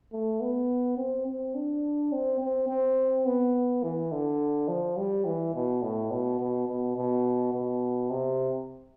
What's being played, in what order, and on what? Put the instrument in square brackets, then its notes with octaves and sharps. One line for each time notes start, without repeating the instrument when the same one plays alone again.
[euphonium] A3
B3
C4
C4
D4
C4
C4
C4
B3
E3
D3
F3
G3
E3
B2
A2
B2
B2
B2
B2
B2
C3